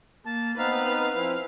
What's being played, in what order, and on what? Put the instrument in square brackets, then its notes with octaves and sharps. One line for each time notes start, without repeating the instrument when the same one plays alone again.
[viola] A#3 [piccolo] A5
[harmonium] B3 C4 D#4 [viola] B4 [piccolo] F5
[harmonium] F3 C4 E4